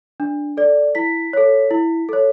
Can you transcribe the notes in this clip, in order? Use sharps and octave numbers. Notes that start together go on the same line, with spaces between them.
D4
A4 D5
E4 B6
A4 C#5
E4
A4 C#5